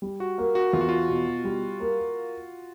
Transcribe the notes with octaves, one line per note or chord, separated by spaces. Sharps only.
G3
F#4
A#3
F#4
E2 F4
F#4
F4
B2
G3
A#3